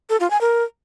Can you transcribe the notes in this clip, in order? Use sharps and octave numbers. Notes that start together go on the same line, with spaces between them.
A4
F4
G#5
A#4